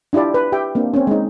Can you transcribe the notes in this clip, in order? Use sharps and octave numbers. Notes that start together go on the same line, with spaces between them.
D4 E4 F4 G4 D5
B4
G4 E5 G5
A#3 C4 D4
C4 C#4
G#3 D#4